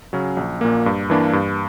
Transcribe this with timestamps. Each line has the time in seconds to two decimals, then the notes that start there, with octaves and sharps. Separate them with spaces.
0.13 C#3 F#3 C#4
0.37 A#1
0.61 A#2 A#3
0.86 G2
1.10 E3 A#3 D4
1.33 G2